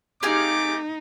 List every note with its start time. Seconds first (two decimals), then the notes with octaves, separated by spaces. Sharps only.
0.23 A3 C4 D#4 G4 G#4 F5 D6